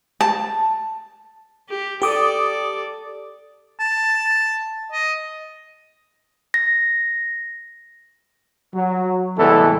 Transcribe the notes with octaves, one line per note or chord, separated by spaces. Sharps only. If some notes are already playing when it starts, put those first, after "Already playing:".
A5
G4
G4 A4 D5 D6 D#6
A5
D#5
A#6
F#3
C2 A2 E3 G#3 B3 A4